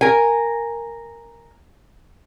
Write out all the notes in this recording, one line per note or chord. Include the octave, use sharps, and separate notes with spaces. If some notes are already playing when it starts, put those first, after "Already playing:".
A#4 G#5